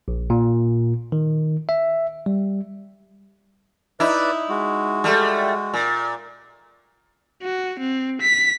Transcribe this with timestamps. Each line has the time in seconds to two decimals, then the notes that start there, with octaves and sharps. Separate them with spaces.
0.08 A#1
0.30 A#2
1.12 D#3
1.69 E5
2.26 G3
4.00 D#4 E4 B4 D5
4.49 G#3 F#4
5.04 G3 A3
5.74 A#2
7.42 F#4
7.79 C4
8.21 B6